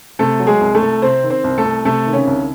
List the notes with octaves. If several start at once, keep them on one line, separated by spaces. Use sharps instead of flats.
C3 A3 A4
F#3
G#3 G#4
C2
A3 A4
C2
C3 C4 C5
D#3
C4 C5
C2
A3 A4
C2
C3 A3 A4
D#3
C#3 C#4
C2